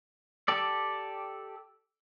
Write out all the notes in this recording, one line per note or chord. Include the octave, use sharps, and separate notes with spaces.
G4 A4 D5